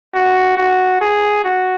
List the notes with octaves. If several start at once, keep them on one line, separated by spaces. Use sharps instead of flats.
F#4
F#4
G#4
F#4